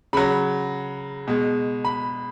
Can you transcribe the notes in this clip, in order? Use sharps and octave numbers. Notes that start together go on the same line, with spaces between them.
C#3 F#3 B5
B2 G#3
B5